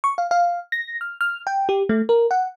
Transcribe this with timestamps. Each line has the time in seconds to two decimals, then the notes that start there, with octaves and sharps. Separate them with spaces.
0.04 C#6
0.18 F5
0.31 F5
0.72 A#6
1.01 F6
1.21 F6
1.47 G5
1.69 G4
1.89 A3
2.09 A#4
2.31 F#5